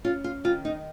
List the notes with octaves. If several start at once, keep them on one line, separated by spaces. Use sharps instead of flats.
C#4 F4
F4
D#3 F4
D#4